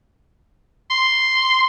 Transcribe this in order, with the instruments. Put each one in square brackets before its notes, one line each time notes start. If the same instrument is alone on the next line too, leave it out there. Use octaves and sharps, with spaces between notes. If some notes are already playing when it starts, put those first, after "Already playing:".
[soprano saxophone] C6